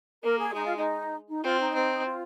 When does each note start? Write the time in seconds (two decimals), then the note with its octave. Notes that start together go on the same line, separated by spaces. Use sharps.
0.23 A#3 A#4
0.38 G#4
0.53 G#3 D#4
0.65 F4
0.76 D#4
1.29 D#4
1.44 C4 F4
1.60 D#4
1.75 C4
2.05 F4